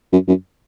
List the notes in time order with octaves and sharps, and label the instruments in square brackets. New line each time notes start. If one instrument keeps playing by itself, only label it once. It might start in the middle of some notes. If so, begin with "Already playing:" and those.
[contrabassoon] F#2
F#2